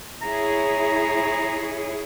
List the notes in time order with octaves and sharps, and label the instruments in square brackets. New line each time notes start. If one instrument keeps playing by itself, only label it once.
[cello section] E4 G#4 C#5 [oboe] A#5